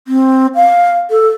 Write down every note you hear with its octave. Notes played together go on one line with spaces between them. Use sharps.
C4
F5
A4